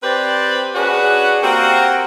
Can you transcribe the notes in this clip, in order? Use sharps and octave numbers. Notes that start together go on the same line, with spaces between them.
C4 G4 B4 C5 D5
C#4 D4 F#4 G#4 B4
A#3 C4 F#4 G4 A#4